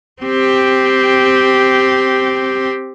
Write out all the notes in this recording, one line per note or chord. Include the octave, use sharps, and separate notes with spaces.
C4 G4